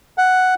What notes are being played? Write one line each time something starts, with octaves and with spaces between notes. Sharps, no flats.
F#5